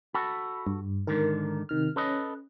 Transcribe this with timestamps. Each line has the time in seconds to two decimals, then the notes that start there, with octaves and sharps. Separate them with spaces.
0.14 F#4 A4 B5
0.67 G2
1.07 G#2 D3 D#3 A#4
1.69 C3 D#3 F6
1.96 C#4 A4 B4 D#5